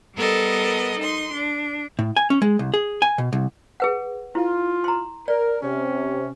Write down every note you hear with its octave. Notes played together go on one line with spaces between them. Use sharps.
G3 B3 A4 A#4 D#5
D#4 C6
D4
A2
G#5
C#4
G#3
C2
G#4
G#5
B2
C2
G#4 B4 F#5
E4 F4
A#5 C6
A#4 D5
C3 C#4